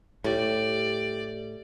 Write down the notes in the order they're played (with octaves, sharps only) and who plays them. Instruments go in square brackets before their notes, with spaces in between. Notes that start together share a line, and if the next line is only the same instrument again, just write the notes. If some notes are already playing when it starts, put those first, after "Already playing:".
[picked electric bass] A2 [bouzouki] G3 [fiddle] D5